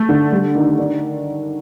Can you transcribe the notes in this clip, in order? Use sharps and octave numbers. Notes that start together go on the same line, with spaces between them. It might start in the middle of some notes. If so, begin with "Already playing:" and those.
Already playing: A3
D3
G3
D#3
D4